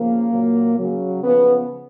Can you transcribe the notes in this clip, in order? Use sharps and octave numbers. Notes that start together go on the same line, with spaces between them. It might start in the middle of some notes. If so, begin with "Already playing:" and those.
Already playing: C#3 F3 A#3
A#2 F#3
C#3 F#3
C#3 F3 B3